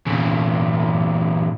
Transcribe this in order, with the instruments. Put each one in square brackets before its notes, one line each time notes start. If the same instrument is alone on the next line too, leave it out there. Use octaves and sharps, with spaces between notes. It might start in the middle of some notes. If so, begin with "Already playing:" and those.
[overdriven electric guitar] E2 A#2